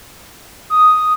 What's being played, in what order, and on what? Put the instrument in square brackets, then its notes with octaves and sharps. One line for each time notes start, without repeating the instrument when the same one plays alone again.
[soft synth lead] D#6